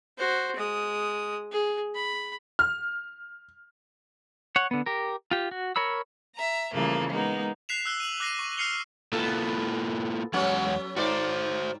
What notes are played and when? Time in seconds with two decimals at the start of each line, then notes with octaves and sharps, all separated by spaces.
0.18 F#4 C5
0.56 G#3 D#6
1.52 G#4
1.95 B5
2.59 F6
4.56 C#5 F#5
4.71 D3 B3
4.86 G4 A#4
5.31 F4 G4
5.51 F#4
5.76 A#4 C#5 B5 E6
6.34 E5 A#5
6.73 C#3 E3 F3 G3 A3 A#3
7.10 G#3 A#3 B3 D#4
7.69 F#6 B6 C7 E7 F7
7.85 E6 F#6 G7
8.00 D#7 F#7
8.20 D6 F#6 A#6 C7 D#7
8.39 C#6
8.57 F6 F#6 C7 C#7 F7 G7
9.13 A#3 B3 E4 F4 A4
10.33 E2 F#3 G#3 B3 C#4 F#5
10.96 G#2 F#4 C5 D5